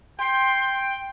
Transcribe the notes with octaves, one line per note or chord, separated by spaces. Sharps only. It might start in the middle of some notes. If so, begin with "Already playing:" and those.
G5 C6